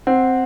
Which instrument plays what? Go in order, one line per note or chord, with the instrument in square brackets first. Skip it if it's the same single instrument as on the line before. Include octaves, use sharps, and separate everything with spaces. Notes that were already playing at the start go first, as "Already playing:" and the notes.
[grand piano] C4 [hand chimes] F#5